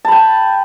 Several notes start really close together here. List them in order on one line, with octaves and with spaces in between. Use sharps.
A5 B5 G5